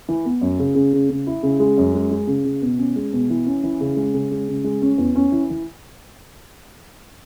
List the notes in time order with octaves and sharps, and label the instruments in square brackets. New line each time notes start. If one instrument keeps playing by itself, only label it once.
[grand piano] E3
B3
F#2
C#3
C#3
C#3
C#3
E4
C#3
G#3
F#2
G#3
G#3
C#3
C#3
B2
C#4
G#3
B2
E3
C#4
E3
C#3
G#3
C#3
G#3
C#3
G#3
C#4
E2
C#4
E3
E3